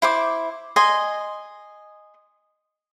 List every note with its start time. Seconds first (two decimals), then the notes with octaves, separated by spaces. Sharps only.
0.02 E4 C5 D6
0.76 D#5 G#5 C6